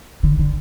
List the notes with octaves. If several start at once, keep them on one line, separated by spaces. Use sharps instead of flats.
D3
D3